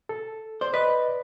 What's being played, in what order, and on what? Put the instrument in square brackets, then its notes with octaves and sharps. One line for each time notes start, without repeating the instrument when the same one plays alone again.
[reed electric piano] A4
[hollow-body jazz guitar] C5 [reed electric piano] D5
[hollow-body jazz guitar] B4 [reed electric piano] D5 D#5